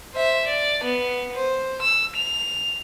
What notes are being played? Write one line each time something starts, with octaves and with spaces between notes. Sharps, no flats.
C5 E5
D5
B3
C5
E6
F7